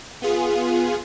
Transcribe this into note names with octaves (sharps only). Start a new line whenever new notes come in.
B3 F4 G#4